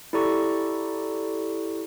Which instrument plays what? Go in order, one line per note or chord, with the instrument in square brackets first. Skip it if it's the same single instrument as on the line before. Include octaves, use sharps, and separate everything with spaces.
[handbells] E4 G4 A4 D5 A#5 C#6